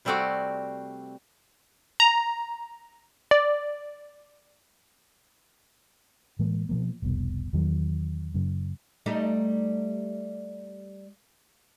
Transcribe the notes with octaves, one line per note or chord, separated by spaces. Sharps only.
C3 G3 A3 C4 F#4 D5
A#5
D5
A2 E3 G#3 A#3
B2 F3 A#3
F1 C2 B2
E2 D#3 F#3
F#2 C#3
G3 A3 D#4